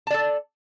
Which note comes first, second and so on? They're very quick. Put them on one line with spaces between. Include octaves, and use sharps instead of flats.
A5 D5 A4